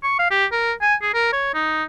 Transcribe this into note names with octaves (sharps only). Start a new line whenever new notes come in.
C#6
F5
G4
A#4
G#5
G#4
A#4
C#5
D#4